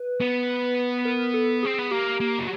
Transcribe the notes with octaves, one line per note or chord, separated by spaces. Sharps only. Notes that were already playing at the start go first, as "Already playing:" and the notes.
Already playing: B4
B3
A#4
A4
C4 G#4
B3
A#3 G4
A#3
F#3